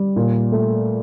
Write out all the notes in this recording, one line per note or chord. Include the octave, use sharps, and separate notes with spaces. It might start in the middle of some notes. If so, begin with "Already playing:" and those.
Already playing: G3
A#2
A3